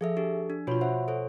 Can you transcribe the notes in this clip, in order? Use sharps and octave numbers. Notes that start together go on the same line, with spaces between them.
F3 G#4 A4 E5
D4 G4 A4
D4
B2 F4 F#4 C#5 B5
C5 E5 F#5
A4 C5 C#5